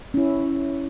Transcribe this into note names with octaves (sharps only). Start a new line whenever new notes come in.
C#4 E4